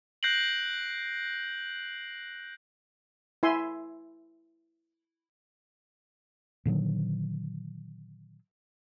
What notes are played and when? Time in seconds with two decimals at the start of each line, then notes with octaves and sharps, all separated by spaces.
0.23 F#6 G6 A#6 C7 D7 F#7
3.43 E4 E5 G#5 C6
6.65 A#2 D3 D#3 F#3